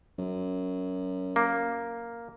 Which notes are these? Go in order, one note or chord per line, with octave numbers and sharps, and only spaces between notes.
F#2
A#3